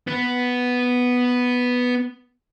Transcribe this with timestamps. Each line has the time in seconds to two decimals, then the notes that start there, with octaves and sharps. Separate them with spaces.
0.07 B3 B4